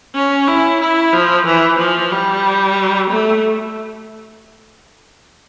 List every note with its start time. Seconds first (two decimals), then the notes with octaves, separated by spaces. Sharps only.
0.15 C#4
0.47 E4
0.81 E4
1.13 F3
1.47 E3
1.79 F3
2.12 G3
3.10 A3